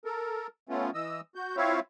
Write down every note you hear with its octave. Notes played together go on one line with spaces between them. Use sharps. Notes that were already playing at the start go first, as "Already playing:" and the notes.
A4 A#4
A3 B3 C#4 F4
E3 D#5 E6
F#4 G6
C4 E4 F4 C#5 E5 F5